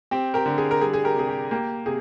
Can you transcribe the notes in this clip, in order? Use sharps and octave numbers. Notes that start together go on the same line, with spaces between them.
C4 G4
G4 A#4
D3
G#4
A#4
G3 G#4
G#4
G4 A#4
C3 G#4
G4
A#3 G4
C3 G#4